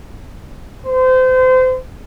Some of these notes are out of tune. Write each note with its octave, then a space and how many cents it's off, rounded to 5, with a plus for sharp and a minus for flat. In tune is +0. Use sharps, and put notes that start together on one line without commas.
C5 -30